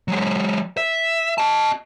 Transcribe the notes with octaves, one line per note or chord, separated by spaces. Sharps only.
F#3 G#3
E5
D#5 A5